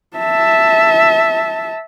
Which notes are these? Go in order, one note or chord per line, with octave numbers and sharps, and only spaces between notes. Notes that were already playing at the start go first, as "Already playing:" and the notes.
E5 A5